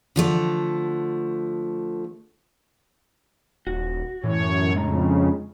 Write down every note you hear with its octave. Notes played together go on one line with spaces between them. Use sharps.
D3 F3 A3
D#1 F#4
F#2 A2 E3 C#5
F2 C#3 G#3 D4 A#5